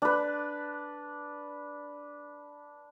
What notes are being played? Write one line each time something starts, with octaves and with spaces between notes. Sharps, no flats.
D4 B4